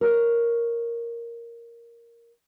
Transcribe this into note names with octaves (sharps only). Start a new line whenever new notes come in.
A#4 C#5